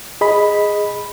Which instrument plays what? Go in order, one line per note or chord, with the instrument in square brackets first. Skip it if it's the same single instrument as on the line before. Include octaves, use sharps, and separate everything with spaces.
[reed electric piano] G#4 D#5 B5